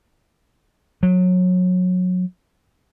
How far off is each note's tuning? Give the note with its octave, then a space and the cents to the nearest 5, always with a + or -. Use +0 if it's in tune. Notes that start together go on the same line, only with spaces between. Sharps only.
F#3 -25